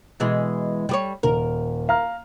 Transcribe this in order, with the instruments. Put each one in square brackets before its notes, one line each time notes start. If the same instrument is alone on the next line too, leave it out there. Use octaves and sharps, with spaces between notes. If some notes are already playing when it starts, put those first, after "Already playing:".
[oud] B2 E3 G#3
G3 G4 C#5
[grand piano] D#1 [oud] A#4
[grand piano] F5 A#5 F6